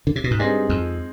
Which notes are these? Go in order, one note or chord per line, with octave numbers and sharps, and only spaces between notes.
D3
C3
B2
G#2
G2 G#3 C4 D#4 G#4
F2